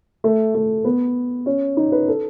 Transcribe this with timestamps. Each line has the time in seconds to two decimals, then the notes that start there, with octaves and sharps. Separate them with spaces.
0.24 A3
0.55 A3
0.84 B3
1.46 C#4
1.77 D#4
1.92 B4
2.08 A4